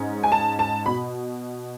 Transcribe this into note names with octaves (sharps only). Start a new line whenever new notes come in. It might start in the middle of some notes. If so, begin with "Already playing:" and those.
Already playing: G#2 G#3 C#4
G#5
A5
A5
B2 B5